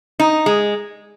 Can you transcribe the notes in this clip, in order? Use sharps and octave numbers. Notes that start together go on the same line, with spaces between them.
D#4
G#3